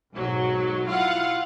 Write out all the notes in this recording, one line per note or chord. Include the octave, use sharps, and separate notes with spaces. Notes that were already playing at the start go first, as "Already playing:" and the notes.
B1 G#2 F#3
E4 F4 F5 F#5